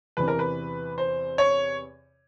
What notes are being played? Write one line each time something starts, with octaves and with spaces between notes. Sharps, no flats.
E2 C3 E3 B4
A#4
B4
C5
C#5